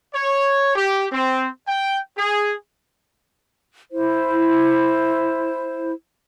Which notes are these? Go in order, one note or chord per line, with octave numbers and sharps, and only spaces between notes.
C#5
G4
C4
G5
G#4
E4 C5